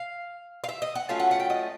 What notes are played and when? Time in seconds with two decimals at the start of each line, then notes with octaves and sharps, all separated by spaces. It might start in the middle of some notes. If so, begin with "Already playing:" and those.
Already playing: F5
0.64 F5
0.69 E5
0.82 D#5
0.95 F#5
1.09 F#3 A3 C#4 F4 F5
1.20 F#5
1.31 F#5
1.40 G5
1.50 D#5